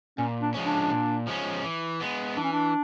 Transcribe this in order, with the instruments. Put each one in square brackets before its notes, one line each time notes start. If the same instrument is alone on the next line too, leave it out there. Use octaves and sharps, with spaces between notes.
[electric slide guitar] A#2 [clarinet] C#4
[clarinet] D4
[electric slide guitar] F3 G#3 C#4
[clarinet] D4
[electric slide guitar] A#2
F3 G#3 C#4
E3
G#3 B3
[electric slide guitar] E3 [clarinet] D4
[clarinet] C#4
D4